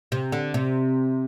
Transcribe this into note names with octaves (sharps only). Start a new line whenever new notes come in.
C3
D3
C3